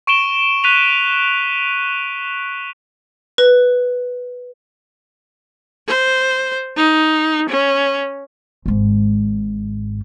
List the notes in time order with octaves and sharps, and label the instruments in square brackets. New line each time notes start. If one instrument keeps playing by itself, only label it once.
[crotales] C#6 D7 E7 G7
F#6 B6 D#7 F7
[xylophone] B4
[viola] C5
D#4
C#4
[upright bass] G#1 G#2